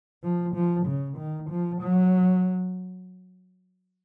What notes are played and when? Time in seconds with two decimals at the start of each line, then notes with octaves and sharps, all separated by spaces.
0.24 F3
0.55 F3
0.86 C#3
1.17 D#3
1.50 F3
1.81 F#3